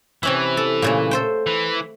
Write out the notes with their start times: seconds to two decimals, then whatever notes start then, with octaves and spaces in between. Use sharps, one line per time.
0.23 C3 E3 C#4 E4
0.57 A4
0.82 A#2 C#3 A3
1.11 A4 C5 G5
1.47 E3